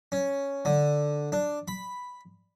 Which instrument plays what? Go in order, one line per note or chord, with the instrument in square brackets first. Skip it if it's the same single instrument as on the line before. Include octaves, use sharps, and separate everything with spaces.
[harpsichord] C#4
D3
D4
B5